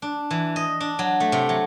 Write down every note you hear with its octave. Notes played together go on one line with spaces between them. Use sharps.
D4
E3
D#5
D4
F#3
A3
C3
F#3